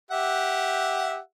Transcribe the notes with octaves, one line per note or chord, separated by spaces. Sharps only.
G4 E5 F#5